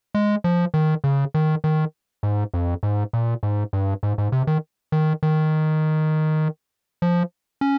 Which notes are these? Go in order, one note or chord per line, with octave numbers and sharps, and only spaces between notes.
G#3
F3
D#3
C#3
D#3
D#3
G#2
F2
G#2
A#2
G#2
G2
G#2
G#2
C3
D#3
D#3
D#3
F3
C#4